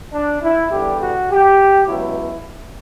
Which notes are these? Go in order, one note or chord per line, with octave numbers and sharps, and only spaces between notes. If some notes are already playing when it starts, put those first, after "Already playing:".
D4
E4
E2 D3 G3 G4
F#4
G4
C#2 B2 F#3 E4